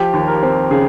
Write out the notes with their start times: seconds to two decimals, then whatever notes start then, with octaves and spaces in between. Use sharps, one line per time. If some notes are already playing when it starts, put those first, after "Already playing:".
Already playing: F3 G4
0.13 D#2
0.27 A#4
0.43 C4
0.71 C#3 G#4